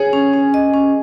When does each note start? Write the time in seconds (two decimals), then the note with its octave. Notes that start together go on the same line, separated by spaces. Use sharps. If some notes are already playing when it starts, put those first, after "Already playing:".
Already playing: G#4 C#5
0.13 C#4
0.33 C#4
0.54 D#5
0.74 C#4